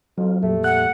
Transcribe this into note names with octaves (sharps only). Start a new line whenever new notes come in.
F2 F#3 C4 F4
F2 A#2 G3 A3
F#5 F#6